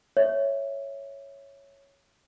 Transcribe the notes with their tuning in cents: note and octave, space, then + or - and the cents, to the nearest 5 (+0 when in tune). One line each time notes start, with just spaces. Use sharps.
C#5 +0 E5 +0